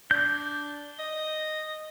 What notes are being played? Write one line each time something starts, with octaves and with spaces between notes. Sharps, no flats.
D4 G6
D#5